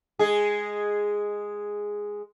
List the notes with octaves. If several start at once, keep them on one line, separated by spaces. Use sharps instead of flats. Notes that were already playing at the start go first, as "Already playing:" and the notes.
G#3 G#4